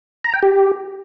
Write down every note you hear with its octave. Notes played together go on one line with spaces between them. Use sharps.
A#5
G5
G4